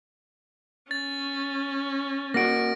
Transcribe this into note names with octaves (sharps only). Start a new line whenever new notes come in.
C#4 A6
A#3 F#4 A#6 D7